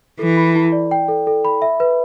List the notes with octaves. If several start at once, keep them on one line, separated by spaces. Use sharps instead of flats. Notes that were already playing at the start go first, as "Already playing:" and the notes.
E3 A4
B5
E4
D5
G5
A4
A4
B5
E5
B4